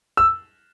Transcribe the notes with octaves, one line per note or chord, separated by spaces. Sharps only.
E6